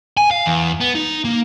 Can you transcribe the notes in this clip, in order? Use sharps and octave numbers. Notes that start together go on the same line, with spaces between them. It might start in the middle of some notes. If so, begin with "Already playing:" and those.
G#5
F5
E2
B3
D#4
A#3